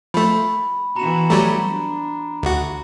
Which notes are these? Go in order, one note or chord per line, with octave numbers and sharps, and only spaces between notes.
F3 A3 B5
E3 B3 F#4 A#5 E7
F#3 G3 A3 A#5
D4
D2 F#4